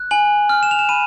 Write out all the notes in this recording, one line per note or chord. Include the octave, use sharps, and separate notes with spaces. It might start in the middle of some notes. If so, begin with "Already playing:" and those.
Already playing: F#6
G#5 F#7
F6
E7
F7
E7
B5 D#7